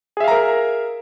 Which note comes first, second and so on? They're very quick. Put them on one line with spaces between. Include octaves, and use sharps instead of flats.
G#4 E5 F5 A#5 A#4